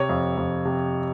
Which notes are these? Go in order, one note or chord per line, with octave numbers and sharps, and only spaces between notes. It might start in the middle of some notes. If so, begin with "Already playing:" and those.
Already playing: C3 C#5
F2
F2
C3